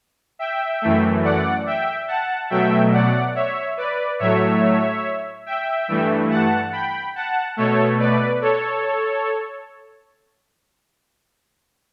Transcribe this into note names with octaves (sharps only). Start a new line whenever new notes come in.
E5 G5
F#2 E3 A3
D5 F#5
E5 G5
F#5 A5
B2 F#3 A3 E5 G5
D5 F#5
C#5 E5
B4 D5
A2 F#3 A3 C#5 E5
E5 G5
G2 E3 A3
F#5 A5
G5 B5
F#5 A5
B2 A3 A4 C#5
B4 D5
A4 C#5